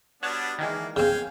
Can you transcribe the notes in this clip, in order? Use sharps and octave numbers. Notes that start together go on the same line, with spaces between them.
G3 B3 D4 F#4 C#5 A5
D#3 E3 G#3 A#3
C#3 C4 F5 G5 G#5